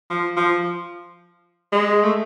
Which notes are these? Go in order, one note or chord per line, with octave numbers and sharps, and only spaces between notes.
F3
F3
G#3
A3